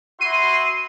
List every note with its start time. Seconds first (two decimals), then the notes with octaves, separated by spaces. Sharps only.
0.21 E4 F#4 C6 C7 D#7